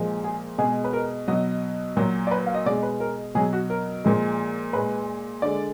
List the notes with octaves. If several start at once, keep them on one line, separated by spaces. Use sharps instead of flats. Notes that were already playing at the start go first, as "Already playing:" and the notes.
Already playing: A#2 F3 G#3
G#4
B2 G#3 G#4
B4
A#4
B2 F#3 D#5
A#2 F#3
D5
B4
F5
D#5
B2 G#3 D5
B4
A#4
B2 F#3 G#4
F#4
A#4
A#2 F3 G#3
A#2 G#3 B4
D3 G#3 D5